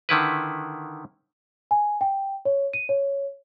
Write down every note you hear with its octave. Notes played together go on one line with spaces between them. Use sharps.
D3 D#3 E4 B4
G#5
G5
C#5
D#7
C#5